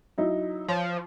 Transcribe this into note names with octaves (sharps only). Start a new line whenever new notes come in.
F#3 D#4 E4
F3 C#5